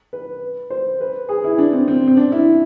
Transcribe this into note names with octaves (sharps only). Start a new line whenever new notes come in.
B4
C5
B4
G#4
E4
D4
C4
C4
C4
D4
E4